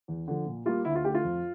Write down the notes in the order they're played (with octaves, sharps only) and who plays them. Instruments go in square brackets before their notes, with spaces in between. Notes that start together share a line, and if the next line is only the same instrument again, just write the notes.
[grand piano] E2
D3 F3
A#2
G3 A#3 F4
D2 E4
F4
D3 A3 G4
F4
F2